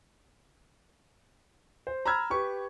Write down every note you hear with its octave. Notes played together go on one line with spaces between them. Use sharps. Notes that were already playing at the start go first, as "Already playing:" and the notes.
C5
A#5 B5 E6 F6 G#6
G4 B4 C#6